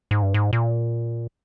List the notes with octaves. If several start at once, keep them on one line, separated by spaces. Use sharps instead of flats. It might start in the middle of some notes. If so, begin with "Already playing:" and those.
G#2
G2
G#2
A#2